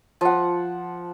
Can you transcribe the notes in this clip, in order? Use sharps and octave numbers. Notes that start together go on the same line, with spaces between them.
F3 F#5